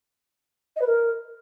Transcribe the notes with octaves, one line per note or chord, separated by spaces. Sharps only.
D#5
B4
A#4